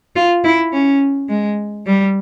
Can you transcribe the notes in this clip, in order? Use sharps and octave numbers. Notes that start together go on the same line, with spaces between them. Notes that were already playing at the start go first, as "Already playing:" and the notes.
F4
E4
C#4
G#3
G3